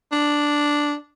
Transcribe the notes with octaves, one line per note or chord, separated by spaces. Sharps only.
D4